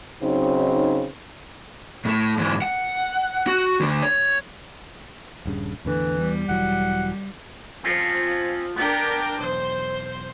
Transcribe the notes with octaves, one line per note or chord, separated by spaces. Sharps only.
C#3 F#3 C4 D#4
A2 A3
G#2 E3
F#5
F#4
D2 D3
C#5
D#1 G2 C#3
E2 A2 D3 E3
E2 G3
E1 E3 F#3 F#5
F3 C4 C#4 F4
B3 D4 A#4 G5
B1 E2 C5